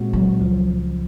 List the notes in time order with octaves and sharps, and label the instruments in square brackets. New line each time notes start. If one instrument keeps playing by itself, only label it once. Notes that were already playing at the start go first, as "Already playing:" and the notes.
Already playing: [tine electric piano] A#2 G#3 C4 F#4
[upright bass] F#3
[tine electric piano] C#2 C#3 F3